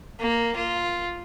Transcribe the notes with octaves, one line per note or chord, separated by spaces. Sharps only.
A#3
F4